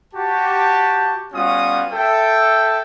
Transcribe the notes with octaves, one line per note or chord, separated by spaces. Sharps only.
F#4 G4 A5
G3 B3 C#4 F4 F#4 D#6
A4 E5 G5